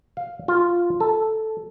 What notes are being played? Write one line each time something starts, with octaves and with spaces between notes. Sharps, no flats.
F5
F4
A4